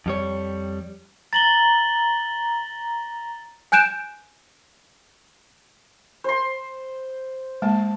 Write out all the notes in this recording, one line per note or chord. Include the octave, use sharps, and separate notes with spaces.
F2 G3 C#5
A#5 A6 F#7 G7
G#5 F#6 G6 D7 E7
C5 C6
G#3 A#3 A5